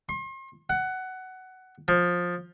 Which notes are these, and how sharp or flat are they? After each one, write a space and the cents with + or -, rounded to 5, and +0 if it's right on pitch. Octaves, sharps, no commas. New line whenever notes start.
C6 +40
F#5 +15
F3 +15